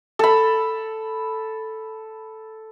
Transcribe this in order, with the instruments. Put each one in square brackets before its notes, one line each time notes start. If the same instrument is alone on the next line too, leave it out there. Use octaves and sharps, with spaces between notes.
[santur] A4 B5